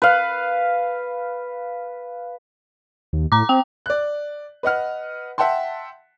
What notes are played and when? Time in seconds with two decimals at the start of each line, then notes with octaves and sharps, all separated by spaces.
0.02 B4 F5
3.13 D#2
3.32 A2 A#5 D6
3.49 C4 G5
3.86 D5 F#6
4.63 B4 D#5 F#5 F6
5.38 E5 F#5 G5 A5 C6